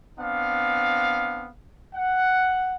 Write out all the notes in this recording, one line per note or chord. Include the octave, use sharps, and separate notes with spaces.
B3 C4 D4 F5
F#5